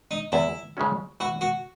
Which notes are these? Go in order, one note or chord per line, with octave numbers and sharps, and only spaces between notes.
D#4
E2 E4
C#3 G#3 C#4 F#4
E3 F#4
F#4